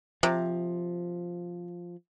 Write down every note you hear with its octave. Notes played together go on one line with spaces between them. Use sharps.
C3 F3